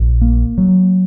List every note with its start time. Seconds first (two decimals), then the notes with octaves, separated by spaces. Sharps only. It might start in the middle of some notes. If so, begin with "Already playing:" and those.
Already playing: A#1
0.21 A#3
0.58 F#3